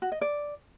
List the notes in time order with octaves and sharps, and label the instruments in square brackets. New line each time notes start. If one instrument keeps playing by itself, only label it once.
[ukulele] F#4
D#5
D5